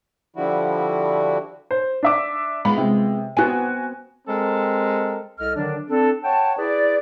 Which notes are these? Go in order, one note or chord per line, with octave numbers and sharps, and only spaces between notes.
D3 F3 G3 E4 F#4
C5
D4 E5 D6
G#3 B3 F4 B5
C3
B3 C4 F#4 G#5
G#3 C4 A4 A#4
C2 A4 D#5 F6
D3 D#3 F#3 D4
C4 D4 A4
C#5 F#5 G5 A5
E4 G#4 B4 D5